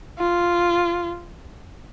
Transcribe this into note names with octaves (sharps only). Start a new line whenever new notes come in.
F4